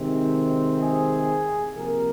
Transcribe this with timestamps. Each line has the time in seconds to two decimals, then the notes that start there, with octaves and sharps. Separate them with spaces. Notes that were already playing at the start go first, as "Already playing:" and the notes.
Already playing: C3 D#3 G#3 C4
0.80 G#4
1.77 C3 F3 A#3 A#4